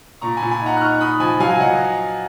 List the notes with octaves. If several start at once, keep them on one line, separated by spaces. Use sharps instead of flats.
A#2 A#5 C#6
A#2 G#5 B5
G#5 B5
D#4 F#5 A#5
F#6
D#4 C#6 F6
D#4 B5 D#6
F3 G#5 B5
F#3 F5 G#5
G#5
F#3 D#5 F#5